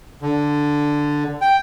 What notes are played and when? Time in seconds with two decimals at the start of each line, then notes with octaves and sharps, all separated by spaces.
0.22 D3
1.42 G5